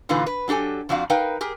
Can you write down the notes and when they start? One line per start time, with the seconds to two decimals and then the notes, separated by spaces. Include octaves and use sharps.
0.09 A#2 D3 E3 D#4 F4 B4
0.26 B4
0.48 F#3 D4 G4 A4 G#5
0.89 F2 F3 D4 F#4 F5
1.10 D#4 A#4 B4 F5 G5
1.41 G4 G#4 A#4